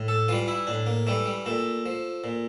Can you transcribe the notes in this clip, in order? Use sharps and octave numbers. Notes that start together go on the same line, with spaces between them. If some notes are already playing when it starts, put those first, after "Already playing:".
Already playing: A2
A4
E3 G3 F4
E4
A2 D4
A#3
E3 G3 A3
G3
A#2 A3
F3
A#2